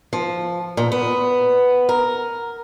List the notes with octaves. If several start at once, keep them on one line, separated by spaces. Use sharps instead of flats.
F3
A#2
B3
A#4